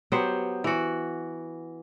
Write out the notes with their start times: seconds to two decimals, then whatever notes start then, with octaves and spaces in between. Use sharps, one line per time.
0.12 F#3 B3 G4 C5
0.64 E3 F#4